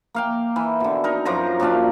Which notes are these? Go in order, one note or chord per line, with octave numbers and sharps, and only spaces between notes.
A#3 F5 G5
E3
B2 D3
D#4 A#4
F#2 F3 A#4 A#5
F#2 A#2 D4 F5